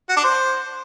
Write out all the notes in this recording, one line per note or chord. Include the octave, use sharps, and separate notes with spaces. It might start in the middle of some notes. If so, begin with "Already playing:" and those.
F#4
D4
C5